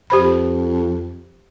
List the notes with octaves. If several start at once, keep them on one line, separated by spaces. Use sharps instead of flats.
F2 G4 C5 B5